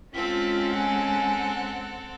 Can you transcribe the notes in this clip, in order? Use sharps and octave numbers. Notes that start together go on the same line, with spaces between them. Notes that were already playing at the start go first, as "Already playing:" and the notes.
G#3 C4 C#4 F4 A4 G5 B6
F#5 G#5